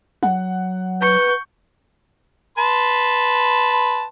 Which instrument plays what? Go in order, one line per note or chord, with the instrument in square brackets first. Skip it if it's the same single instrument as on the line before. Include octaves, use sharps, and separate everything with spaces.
[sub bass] F#3 [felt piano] F#5
[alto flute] B4 [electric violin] C#6 G6
[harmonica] B4 A5 C6